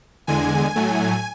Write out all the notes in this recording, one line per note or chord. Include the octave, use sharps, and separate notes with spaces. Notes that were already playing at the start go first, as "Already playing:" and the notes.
E2 D3 G#3 G#5
A2 F#3 A3